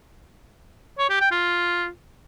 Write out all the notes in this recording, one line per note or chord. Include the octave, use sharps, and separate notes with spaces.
C#5
G4
G5
F4